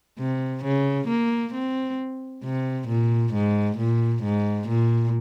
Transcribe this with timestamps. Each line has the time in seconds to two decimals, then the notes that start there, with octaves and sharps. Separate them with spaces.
0.19 C3
0.64 C#3
1.08 A#3
1.54 C4
2.44 C3
2.88 A#2
3.34 G#2
3.78 A#2
4.23 G#2
4.68 A#2